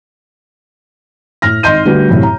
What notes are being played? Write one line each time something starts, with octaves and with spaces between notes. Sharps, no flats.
A2 F6 A#6
G#1 D#5 C6 G6 D#7
D3 G3 A3 F#4 G4 B4
F#2 A2 C3
A#5